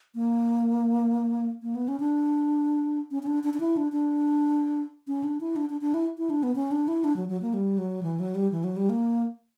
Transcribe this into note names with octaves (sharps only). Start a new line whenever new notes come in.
A#3
A#3
B3
C#4
D4
C#4
C#4
D4
D4
D4
E4
D4
D4
C#4
D4
E4
D4
D4
D4
E4
E4
D4
B3
C#4
D4
E4
D4
F#3
F#3
A#3
G3
F#3
E3
F#3
G3
E3
F#3
G3
A#3